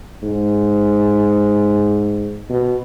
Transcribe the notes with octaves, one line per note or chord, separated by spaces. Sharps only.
G#2
B2